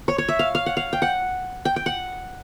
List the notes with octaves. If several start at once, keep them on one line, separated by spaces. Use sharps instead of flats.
C#5
C#5
E5
F5
F5
F#5
F5
G5
F#5
G5
G5
F#5